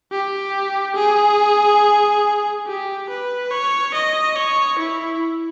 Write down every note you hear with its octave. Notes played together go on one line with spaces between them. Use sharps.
G4
G#4
G4
B4
C#5
D#5
C#5
E4